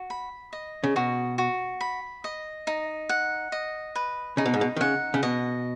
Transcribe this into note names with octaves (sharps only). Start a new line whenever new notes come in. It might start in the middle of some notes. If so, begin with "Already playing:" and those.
Already playing: F#4
B5
D#5
C#3
B2 F#4
F#4
B5
D#5
D#4
F#5
D#5
B4
C#3 D#4
B2
G#2
B2
D#3
C#3 F#5
C#3
B2 D#5